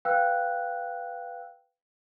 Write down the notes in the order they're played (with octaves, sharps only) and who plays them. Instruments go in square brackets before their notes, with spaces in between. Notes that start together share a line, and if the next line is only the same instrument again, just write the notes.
[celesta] B4 F5 G5 E6 F#6